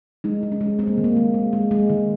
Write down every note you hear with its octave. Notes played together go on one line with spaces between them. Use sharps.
G#3 D#4
G#3
C#4
G#3
G#3 C4
A#3
D#3
A#3
G#3
G#3
G#3
G#3
D#3